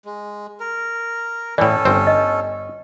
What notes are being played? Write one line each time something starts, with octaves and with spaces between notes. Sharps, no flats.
G#3
A#4
A2 E3 C#4 A4 D5
G1 C4 C5
D#5